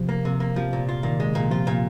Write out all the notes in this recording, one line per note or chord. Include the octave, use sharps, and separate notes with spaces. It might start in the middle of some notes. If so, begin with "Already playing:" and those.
Already playing: C3 F3
A#3
C3
A#3
C3 F3
A#2
F4
A#2 D#3
G#3
A#2
C3 F3 F4
A#2